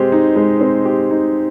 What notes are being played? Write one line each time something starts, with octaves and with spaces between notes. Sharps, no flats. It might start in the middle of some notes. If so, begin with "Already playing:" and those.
Already playing: G#3 C4 G4
D#4
G#3
C4
G4
D#4